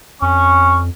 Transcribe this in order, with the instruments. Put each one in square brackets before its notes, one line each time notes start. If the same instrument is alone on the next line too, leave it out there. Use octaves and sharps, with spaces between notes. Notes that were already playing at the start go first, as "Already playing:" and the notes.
[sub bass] F2 [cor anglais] C#4 [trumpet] C#6